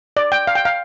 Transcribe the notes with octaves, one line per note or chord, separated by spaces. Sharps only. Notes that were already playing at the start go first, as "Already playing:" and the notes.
D5
G5
F5
G5
F5